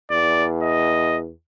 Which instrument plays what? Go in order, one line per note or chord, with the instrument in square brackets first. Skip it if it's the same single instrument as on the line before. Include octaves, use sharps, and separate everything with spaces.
[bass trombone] E2 [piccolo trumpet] D5
[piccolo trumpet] D#5